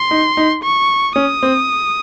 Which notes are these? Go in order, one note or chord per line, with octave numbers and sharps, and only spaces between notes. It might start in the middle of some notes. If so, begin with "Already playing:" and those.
Already playing: C6
D#4
D#4
C#6
C#4 D#6
C4